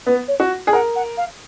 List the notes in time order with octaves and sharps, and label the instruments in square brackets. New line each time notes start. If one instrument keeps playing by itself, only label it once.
[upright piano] B3 [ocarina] B4
[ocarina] C#5
[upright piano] F#4
G#4
[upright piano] A#4 [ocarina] F#5
[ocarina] F#5
F5